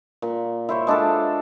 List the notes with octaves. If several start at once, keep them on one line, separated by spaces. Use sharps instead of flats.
A#2
E4 C5 C#5
G#3 D4 F4 A4